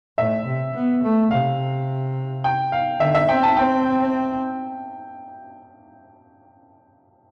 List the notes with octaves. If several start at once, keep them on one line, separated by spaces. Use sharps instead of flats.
A2 E5
C3
B3
A3
C3 F5
G5
F5
D3 E5
E5
C4 G5
A5
C4 G5